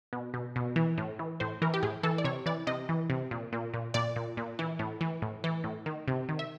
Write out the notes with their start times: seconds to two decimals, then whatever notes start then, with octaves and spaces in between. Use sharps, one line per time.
0.13 B2
0.34 B2
0.56 B2
0.76 E3
0.98 A2
1.19 E3
1.40 A2 C5
1.62 E3 A#4
1.74 G4
1.83 A2 G#4
2.03 E3 A4
2.18 D5
2.24 C3 C#5
2.46 E3 D5
2.67 C3 D#5
2.89 E3
3.10 C3
3.31 A#2
3.53 A#2
3.74 A#2
3.94 A#2 D5
4.16 A#2
4.37 A#2
4.59 E3
4.79 A2
5.01 E3
5.22 A2
5.44 E3
5.64 A2
5.86 D#3
6.08 C3
6.29 D#3
6.39 E5